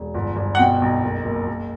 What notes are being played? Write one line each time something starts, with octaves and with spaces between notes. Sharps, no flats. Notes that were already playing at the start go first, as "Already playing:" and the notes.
Already playing: E1
G1
G1
F#5
B2 G5
B1
F#1
F#1
F#1